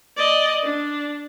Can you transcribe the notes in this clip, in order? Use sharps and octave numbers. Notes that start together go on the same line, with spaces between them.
D5 D#5
D4